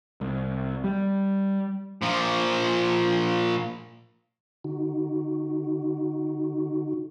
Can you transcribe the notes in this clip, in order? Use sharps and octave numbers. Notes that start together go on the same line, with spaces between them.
C2
G3
A#2 F3
D3 D#4 F#4